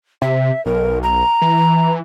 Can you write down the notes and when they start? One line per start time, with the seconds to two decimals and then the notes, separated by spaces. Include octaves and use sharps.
0.22 C3 E5
0.66 B1 A#4
1.03 A#5
1.42 E3